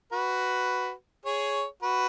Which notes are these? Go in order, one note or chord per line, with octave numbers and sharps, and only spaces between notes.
F#4 B4
G#4 C#5
F#4 B4